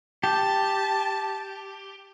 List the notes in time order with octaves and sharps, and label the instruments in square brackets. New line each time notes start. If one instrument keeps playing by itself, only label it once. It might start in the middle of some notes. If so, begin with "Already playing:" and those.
[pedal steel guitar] G4 [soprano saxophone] A5